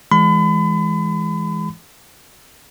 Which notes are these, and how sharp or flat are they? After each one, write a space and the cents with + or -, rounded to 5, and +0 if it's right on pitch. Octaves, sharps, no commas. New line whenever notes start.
E3 +0 G#3 +0 B5 +35